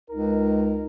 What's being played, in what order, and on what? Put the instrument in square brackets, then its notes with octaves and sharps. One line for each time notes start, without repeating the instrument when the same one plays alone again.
[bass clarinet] C#2 [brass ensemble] D#4 A#4